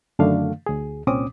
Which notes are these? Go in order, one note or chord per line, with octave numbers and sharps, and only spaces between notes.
F#2 D3 D#3 A3 D4 F5
D2 G#4
C2 A#2 C4 C#4 D6 D#6